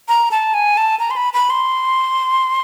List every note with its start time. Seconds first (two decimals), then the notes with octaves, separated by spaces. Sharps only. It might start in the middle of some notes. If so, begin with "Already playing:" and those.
0.08 A#5
0.31 A5
0.54 G#5
0.77 A5
1.00 A#5
1.11 C6
1.16 B5
1.33 B5
1.50 C6